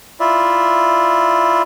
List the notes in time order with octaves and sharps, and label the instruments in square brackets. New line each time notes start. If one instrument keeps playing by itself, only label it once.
[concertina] E4 F4 D5 E5